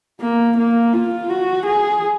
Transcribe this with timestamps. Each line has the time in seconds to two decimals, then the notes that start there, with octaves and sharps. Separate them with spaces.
0.21 A#3
0.57 A#3
0.93 F4
1.29 F#4
1.66 G#4